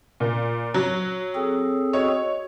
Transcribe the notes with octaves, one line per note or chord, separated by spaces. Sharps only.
A#2
F#3 C#5
C4 G#4 A4
F#4 C#5 D#5